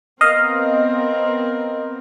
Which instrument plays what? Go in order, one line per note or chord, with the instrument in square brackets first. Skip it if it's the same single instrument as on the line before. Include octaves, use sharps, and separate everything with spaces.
[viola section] B3 C4 A#4 [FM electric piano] D#5 F5